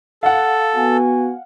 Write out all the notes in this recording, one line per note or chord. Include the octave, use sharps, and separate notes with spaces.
A4 F5 F#5
B3 F#4 G#5